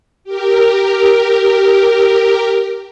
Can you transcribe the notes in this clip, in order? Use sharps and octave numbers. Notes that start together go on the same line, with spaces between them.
G4 A#4